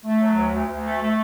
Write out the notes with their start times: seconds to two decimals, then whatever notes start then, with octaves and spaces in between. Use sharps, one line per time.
0.05 A3
0.20 F#3
0.37 D2
0.53 D2
0.69 D2
0.85 A3
1.02 A3